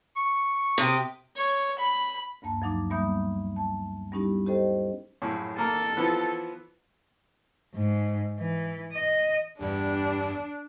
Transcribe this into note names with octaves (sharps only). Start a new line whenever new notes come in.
C#6
C3 G4 D#6
C#5
B5
D2 G2 A#3 A5
F3 F#3 D#4 D6
G3 A#3 B3 E5 D#6 G6
A5
G3 B3 C#4 D#4 E4 G4
C#4 G4 A4 C5 D#5 G5
A#1 F#2 A2
A#3 A4 A#5
E3 F3 B3
G#2
E3
D#5
G1 E2 G2 G3 D4